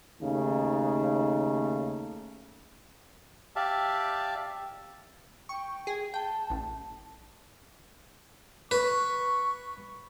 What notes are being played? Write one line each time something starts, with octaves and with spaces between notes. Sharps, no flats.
D#2 C#3 A3 D#4
G4 D5 E5 F5 A5
G5 C#6
G#4
G5 A5
A1
B4 C#6